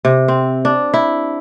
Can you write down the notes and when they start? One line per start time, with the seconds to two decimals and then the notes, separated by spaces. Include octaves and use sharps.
0.05 C3
0.28 C4
0.65 D4
0.94 E4